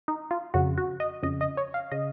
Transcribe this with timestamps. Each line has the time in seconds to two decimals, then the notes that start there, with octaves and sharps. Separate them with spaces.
0.08 D#4
0.31 F4
0.54 F2 C#3 F#4
0.78 F#4
1.00 D#5
1.23 F2 C#3 D#5
1.41 D#5
1.57 C#5
1.74 F5
1.92 C#3 D#5